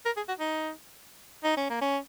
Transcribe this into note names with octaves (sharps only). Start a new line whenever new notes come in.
A#4
G#4
F#4
D#4
D#4
C#4
A#3
C#4